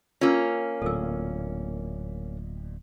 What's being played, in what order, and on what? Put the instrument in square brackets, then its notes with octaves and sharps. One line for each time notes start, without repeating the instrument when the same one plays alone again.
[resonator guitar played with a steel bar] A#3 C#4 [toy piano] F4 E6
[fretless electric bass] D1 A#2 [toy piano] A4 E6